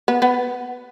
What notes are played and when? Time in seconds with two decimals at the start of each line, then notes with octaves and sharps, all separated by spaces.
0.08 B3
0.22 B3